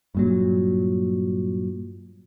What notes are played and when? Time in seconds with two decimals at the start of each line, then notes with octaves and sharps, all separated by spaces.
0.15 G2 A#2 F#3